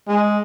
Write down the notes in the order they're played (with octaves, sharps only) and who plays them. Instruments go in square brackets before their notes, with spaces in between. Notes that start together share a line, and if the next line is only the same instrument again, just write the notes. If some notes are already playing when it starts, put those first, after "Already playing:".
[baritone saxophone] G#3